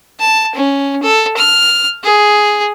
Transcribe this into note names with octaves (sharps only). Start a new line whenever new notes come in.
A5
C#4
A4
F6
G#4